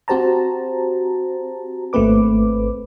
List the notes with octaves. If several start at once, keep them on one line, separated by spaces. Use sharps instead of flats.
C4 F#4 G4 C5 A5 A#5
G#1 A3 A#3 C4 B4 D6